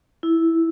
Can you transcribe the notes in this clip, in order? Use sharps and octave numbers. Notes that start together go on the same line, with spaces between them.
E4